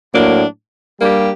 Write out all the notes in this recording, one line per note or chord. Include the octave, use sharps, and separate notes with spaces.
A2 F#3 A#3 D4
G3 A#3 D4 G4